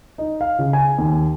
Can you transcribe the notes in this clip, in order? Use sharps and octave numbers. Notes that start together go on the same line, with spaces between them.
D#4
F5
C#3
G#5
D#2